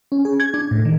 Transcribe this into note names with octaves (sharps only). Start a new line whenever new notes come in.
C#4
G#4
G#6
D4
A2
D#3